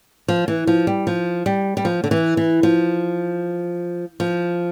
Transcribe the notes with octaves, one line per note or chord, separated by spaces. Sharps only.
F3
E3
F3
G3
F3
G3
G3
F3
D3
E3
E3
F3
F3